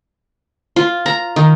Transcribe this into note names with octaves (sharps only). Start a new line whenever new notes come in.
F4
A#5
D#3